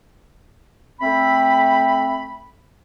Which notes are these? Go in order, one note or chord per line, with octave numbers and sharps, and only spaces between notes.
A3 C4 B5